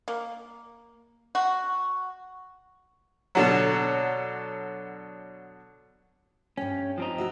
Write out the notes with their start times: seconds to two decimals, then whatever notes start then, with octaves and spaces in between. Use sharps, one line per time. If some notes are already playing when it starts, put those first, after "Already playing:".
0.08 A#3
1.35 F#4
3.35 B2 D3 F#3
6.57 G2 C#4 G5
6.98 F3 C4 D#4
7.18 E4 F#4 E5